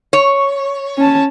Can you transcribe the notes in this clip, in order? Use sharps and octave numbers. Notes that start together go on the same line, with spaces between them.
C#5
C#4 A5